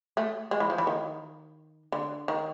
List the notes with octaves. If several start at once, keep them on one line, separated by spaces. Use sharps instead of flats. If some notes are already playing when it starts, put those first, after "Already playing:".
A3
G#3
E3
F3
E3
D#3
D3
D#3